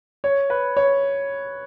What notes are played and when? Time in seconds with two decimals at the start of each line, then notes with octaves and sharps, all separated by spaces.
0.24 C#5
0.50 B4
0.77 C#5